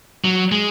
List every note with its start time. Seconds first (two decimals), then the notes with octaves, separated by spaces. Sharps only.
0.24 F#3
0.52 G#3